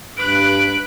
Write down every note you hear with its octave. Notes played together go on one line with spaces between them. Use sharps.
G2 B4 F#6 D7